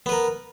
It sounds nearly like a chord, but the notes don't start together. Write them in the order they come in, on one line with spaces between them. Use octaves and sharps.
B3 B4 A#4